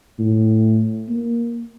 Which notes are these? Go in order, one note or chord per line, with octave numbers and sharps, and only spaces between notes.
A2
A#3